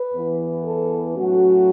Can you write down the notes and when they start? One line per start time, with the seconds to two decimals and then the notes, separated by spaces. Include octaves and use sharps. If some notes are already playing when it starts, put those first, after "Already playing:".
Already playing: B4
0.14 E2 E3 B3
0.65 A4
1.16 A2 F#3 A3 C#4 F#4